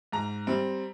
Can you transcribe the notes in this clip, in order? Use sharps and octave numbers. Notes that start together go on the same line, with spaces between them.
G#2 A#5
G3 C4